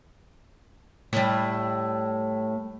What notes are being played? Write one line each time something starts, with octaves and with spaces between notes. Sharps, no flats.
A2 G3